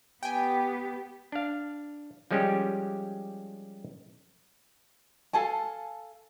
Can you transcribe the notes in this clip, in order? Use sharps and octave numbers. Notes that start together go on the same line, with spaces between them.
B3 G4 G5 G#5
D4 F5
F3 G3 G#3 C#4 F4 G4
A4 F5 G#5 A5